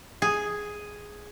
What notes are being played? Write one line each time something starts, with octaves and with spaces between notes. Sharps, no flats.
G#4